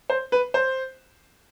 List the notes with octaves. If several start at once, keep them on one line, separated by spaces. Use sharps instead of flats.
C5
B4
C5